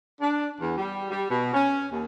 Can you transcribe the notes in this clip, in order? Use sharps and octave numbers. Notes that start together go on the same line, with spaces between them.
D4
E2
G3
G3
B2
C#4
D#2